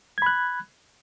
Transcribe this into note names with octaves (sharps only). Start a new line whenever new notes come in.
B5 F#6 G#6